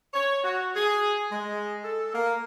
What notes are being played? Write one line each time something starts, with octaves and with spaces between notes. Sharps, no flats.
C#5
F#4
G#4
G#3
A4
A#3